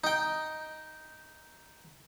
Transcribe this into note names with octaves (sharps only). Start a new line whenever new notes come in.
D#4 G5